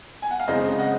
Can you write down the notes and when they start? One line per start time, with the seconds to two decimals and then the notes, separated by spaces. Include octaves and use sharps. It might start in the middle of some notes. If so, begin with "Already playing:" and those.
0.22 G#5
0.31 F#5
0.40 F5
0.47 F#2 C#3 G#3 C4 C5 D#5
0.78 D#5 F#5